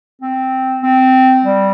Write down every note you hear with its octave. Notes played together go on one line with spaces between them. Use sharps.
C4
C4
G3